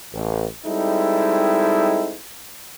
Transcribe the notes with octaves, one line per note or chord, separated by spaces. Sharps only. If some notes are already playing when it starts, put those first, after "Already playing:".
A1
G3 G#3 C4 D#4 E4 A4